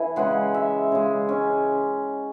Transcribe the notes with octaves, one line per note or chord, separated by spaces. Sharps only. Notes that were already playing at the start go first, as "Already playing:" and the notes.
Already playing: E3 G#5
C#3 G#3 F#5
E5
C#3 G#3
C#4